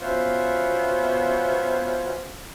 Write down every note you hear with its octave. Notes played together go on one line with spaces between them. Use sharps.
B2 B3 C#4 F4 C5 E5